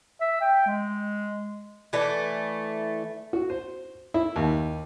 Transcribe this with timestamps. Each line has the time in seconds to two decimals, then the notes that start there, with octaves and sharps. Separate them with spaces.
0.21 E5
0.41 G5
0.67 G#3
1.93 E3 A3 D5
3.33 F#4
3.50 C5
4.14 E4
4.36 D#2